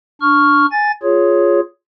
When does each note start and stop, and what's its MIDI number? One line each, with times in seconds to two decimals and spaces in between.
0.21 0.66 62
0.21 0.66 85
0.21 0.66 89
0.72 0.92 80
0.72 0.92 93
1.03 1.60 65
1.03 1.60 68
1.03 1.60 73